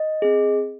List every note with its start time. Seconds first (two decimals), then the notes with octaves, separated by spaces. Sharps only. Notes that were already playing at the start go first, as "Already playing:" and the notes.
Already playing: D#5
0.22 C4 G#4